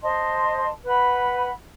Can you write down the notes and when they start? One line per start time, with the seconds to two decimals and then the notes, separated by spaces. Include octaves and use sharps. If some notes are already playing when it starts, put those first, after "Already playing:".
0.02 C5 D#5 A5 C6
0.83 B4 F#5 B5